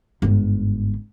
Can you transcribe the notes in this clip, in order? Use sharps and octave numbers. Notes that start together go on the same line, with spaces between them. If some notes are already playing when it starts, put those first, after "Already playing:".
G1 G#2